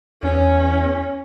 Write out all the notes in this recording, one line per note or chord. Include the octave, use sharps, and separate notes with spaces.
E2 C#4